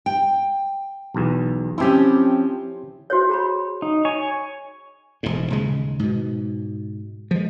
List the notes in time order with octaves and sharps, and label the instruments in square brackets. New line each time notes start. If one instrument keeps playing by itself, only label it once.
[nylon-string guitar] G5
[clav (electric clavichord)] B1 E2
[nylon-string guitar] F3 C4 C#4 [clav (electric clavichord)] E4 G4
[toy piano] F#4 C5 C#5
G#4 A#5 B5
[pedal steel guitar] D#4
C#5 G#5
[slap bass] E1 G#2
D#1 C#3 G#3
G#2 B2
F3 G#3